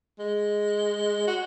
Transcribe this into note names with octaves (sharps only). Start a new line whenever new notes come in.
G#3
F#4